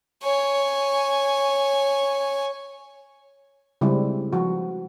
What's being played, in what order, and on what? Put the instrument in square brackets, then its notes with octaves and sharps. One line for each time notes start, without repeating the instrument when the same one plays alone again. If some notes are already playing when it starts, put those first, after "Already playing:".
[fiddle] C#5 G#5
[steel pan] C#3 G3 G#3 C4 E4
F3 F#4